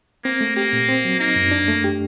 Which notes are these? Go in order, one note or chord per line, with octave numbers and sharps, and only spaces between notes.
A#3 C4
A3
A#3 G4
A#2
C4
F#3
A#3 D#4
F#2
D4
A3
G4